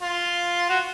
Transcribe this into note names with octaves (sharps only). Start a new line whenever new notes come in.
F4
F#4